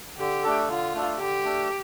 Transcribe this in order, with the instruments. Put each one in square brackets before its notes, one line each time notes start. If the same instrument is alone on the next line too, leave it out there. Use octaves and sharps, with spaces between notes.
[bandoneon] D3 [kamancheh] G4
[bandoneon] A3 D4 A4
[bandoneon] D3 [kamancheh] F4
[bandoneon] A3 D4 A4
[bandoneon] D3 [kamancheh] G4
[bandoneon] A3 D4 A4